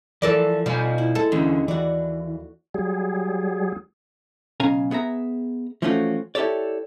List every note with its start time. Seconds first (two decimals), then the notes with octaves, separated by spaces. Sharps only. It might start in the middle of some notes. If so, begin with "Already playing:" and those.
0.22 E3 F3 A4 A#4 D5
0.66 B2 F3 G3 D#4 D5 G#5 B5
0.98 E4
1.15 G#3 E4 A4
1.32 D#2 D3 E3 C#4
1.68 E3 F#4 D5
2.74 F#3 G3 G#4
4.60 B1 C#3 C#4 F5 G#5 A#5
4.91 B3 G#4 E5 A#5
5.82 E3 F3 A3 C#4 F4 F#4
6.35 E4 G4 A4 C#5 D5